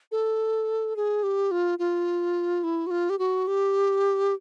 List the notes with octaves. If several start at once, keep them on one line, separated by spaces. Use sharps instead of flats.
A4
G#4
G4
F4
F4
E4
F#4
F4
G4
F#4
G4